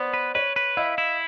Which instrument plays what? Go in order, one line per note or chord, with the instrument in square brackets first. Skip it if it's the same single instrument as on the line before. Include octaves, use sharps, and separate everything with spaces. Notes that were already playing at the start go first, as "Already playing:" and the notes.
Already playing: [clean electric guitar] B3 [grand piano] C5 D5
[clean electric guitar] B4
[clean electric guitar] B4 [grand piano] C#5
[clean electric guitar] B4
[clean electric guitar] E4 [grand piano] D#5 F5
[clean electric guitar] E4